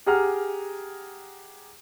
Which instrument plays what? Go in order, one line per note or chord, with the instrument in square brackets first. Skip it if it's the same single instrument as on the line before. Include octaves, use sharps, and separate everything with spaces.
[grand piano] G4 G#4 F#5 A#5 F6